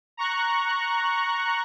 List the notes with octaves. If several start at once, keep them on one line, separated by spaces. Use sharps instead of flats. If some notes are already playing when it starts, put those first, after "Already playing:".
A#5 C#6 F#6